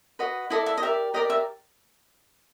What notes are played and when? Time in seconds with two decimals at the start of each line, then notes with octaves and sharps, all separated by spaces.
0.19 F#4 B4 D#5
0.50 E4 A4 D5 D#5
0.66 E5
0.77 D#5
0.82 G4 A#4 D5 E5
1.14 G4 A#4 D5 D#5
1.30 E5